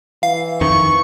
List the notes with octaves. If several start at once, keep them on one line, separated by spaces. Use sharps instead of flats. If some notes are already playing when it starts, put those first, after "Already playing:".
E3 F5
F2 D#3 C#6